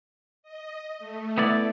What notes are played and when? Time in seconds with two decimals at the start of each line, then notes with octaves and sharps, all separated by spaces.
0.43 D#5
0.99 A3
1.38 B3 E4 D5